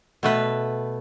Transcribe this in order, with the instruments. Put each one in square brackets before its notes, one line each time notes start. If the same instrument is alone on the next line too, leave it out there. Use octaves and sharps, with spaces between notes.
[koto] B2 A3 B4